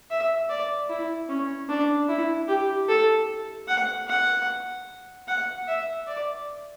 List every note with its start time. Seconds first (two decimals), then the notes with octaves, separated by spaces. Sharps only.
0.10 E5
0.49 D5
0.89 E4
1.29 C#4
1.69 D4
2.08 E4
2.48 G4
2.88 A4
3.68 F#5
4.08 F#5
5.28 F#5
5.68 E5
6.07 D5